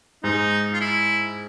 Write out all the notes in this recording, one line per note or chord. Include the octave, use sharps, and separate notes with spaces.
G#2 D#4
F4
E4